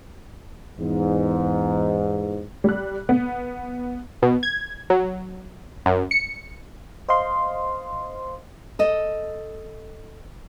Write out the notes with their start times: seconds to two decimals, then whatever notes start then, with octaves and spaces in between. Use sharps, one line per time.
0.78 E2 G#2
2.64 G3 F#6
3.09 B3
4.22 B2
4.43 G#6
4.90 F#3
5.86 F#2
6.11 C#7
7.09 C5 D#5 F5 C6
8.79 A4 D#5